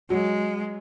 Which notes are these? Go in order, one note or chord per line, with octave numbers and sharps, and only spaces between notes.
F#3 G#3